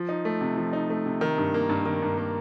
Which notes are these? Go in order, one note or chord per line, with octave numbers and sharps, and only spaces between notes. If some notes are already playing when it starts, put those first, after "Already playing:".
Already playing: F3
D#4
A3
C3
F3
D#4
A3
C3
D#3
G2
A#3
G2
D#3
G2
A#3